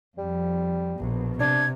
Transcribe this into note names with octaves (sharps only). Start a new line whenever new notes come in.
F2 G3
A#1 B2
C3 D4 G#6